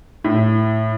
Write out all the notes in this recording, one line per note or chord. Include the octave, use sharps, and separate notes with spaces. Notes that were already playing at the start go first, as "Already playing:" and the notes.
A2